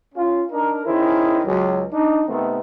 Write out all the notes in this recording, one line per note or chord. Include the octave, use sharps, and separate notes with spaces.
C#4 F4
D4 D#4 A#4
D#3 C#4 E4 G#4 C5
C#2 F#3
D4 D#4
C3 D#3 A3 B3 C4